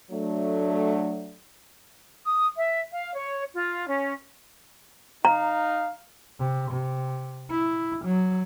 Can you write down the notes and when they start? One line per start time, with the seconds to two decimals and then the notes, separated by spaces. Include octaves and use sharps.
0.11 F#3 A3 D4
2.25 D#6
2.57 E5
2.92 F5
3.14 C#5
3.53 F4
3.87 C#4
5.25 D#4 F5 A#5
6.39 C3
6.71 C3
7.51 E4
8.05 F#3